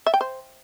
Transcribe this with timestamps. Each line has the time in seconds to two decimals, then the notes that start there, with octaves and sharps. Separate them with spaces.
0.06 E5
0.14 G5
0.21 C5